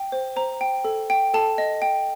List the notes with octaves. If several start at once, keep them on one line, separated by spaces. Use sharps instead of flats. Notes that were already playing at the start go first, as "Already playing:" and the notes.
Already playing: G5
C5
C5 A#5
G5
A4
G5
A4 A5
D#5
G5